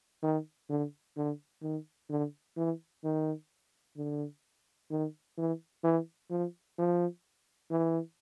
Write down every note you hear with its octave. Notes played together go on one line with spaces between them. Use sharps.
D#3
D3
D3
D#3
D3
E3
D#3
D3
D#3
E3
E3
F3
F3
E3